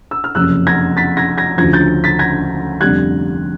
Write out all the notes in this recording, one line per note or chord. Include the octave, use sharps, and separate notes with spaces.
E6
F6
F#1 F2 C3 E6 F#6
G#6 A#6
A6 B6
G#6 A#6
G#6 A#6
D2 C#3 F3 G#6 A#6
G6 A6
A6 B6
G#6 A#6
F1 F2 D3 G3 F#6 G#6